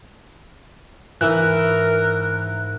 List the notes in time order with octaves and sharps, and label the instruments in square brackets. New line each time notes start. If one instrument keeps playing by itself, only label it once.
[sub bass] G#2 [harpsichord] E3 E4 [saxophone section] A#4 [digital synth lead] F#6